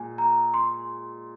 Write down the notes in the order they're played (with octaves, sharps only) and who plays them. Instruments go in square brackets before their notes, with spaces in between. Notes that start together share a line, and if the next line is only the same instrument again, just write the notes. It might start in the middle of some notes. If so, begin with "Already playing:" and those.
Already playing: [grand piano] A#2 G#3 [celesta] G#5
[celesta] A#5
C6